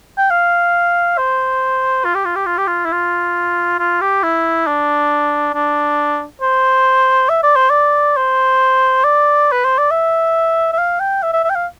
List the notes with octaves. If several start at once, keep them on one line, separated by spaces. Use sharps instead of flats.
G5
F5
C5
F4
G4
F4
G4
F4
G4
F4
E4
F4
F4
G4
E4
D4
D4
C5
E5
D5
C5
D5
C5
D5
B4
C5
D5
E5
E5
F5
G5
E5
E5
E5
G5
F5